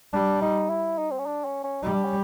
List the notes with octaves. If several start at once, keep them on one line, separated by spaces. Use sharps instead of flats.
G3 D4
D#4
E4
D#4
C4
C#4
D4
C#4
C#4
G3 D#4
D4
C#4